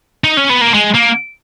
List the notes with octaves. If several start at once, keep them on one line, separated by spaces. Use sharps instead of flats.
D#4
C#4
B3
A#3
G#3
A#3